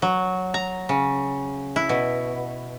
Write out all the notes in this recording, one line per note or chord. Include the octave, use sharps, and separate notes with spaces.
F#3
A#5
C#3
E4
B2